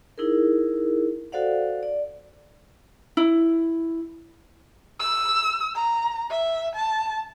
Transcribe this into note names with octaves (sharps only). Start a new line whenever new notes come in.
D#4 E4 G#4 A#4
F#4 A4 C5 D5 F5 F#5
D5
E4
E6
A#5
E5
A5